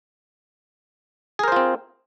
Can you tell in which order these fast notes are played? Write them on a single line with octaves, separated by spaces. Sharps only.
G#4 A#4 C5 F4 C4